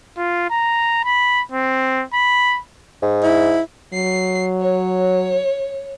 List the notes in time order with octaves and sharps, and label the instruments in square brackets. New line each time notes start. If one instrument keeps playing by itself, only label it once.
[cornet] F4
A#5
B5
C4
B5
[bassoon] G#2
[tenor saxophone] E4
[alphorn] F#3 [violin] C7
[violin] C#5